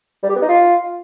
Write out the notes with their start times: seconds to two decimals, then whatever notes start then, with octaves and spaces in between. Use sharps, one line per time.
0.23 G3
0.29 G4
0.36 B3
0.42 D#4
0.49 F4